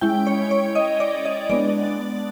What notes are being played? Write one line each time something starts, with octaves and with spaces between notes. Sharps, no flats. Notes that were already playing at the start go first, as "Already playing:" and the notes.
G#3 C#4 E4 G5
C#5
C#5
D#5
D5
D#5
G#3 B3 D4 D5